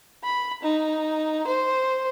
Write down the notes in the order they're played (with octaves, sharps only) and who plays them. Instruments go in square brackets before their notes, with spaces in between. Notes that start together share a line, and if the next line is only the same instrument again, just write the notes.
[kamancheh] B5
D#4
C5